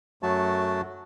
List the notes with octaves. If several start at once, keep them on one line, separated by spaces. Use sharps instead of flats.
F#2 F#3 A3 F#4 A5